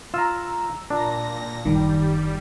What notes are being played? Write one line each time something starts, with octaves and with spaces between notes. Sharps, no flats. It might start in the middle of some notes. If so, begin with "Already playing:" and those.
F4 A#5 E6
A#2 D4 A#6
F#1 D#3 G3 D#4